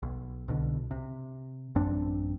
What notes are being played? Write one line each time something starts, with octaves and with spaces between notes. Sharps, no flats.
B1
C2 B2 D3
C3
A1 F#2 C4 D4